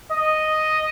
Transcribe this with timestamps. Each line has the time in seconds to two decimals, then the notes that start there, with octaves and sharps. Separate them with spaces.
0.11 D#5